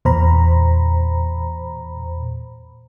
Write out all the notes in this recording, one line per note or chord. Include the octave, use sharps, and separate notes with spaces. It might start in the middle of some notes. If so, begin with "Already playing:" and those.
E2 A#2 C5 A#5 B5